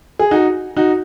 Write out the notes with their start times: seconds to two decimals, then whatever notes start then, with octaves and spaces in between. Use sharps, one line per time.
0.19 G#4
0.31 D#4 F#4
0.76 D#4 F#4